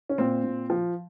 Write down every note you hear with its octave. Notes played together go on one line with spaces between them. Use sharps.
C#4
A#2 C4
A#2
F3